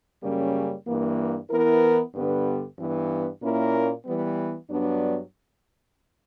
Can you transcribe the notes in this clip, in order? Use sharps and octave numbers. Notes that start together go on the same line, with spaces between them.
F#2 C#3 G3 A#3 C#4
G2 E3 A#3
E3 B3 E4 A#4
G2 D3 G3 B3
G2 E3 B3
A#2 A#3 C#4 E4 A#4
E3 G3 B3
G2 F#3 B3 D4